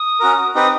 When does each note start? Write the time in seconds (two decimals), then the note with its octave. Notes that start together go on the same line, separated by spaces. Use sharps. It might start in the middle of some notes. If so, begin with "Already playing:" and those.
Already playing: D#6
0.20 C#4 F#4 A#4
0.55 C4 D#4 G4 B4 D#6